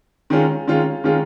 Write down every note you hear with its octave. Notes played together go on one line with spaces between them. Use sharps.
D#3 G#3 C#4 F4
D#3 G#3 C#4 F4
D#3 G#3 C#4 F4